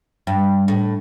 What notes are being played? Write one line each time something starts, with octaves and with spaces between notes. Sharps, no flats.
G2
A2